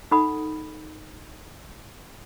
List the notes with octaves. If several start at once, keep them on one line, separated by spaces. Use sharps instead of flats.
D#4 A4 F#5 B5 D#6